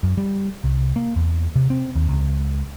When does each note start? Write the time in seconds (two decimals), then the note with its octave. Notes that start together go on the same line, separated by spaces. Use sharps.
0.03 F#2
0.17 G3
0.64 C2
0.96 A#3
1.16 E2
1.56 C3
1.70 C4
1.96 D#2
2.09 C#2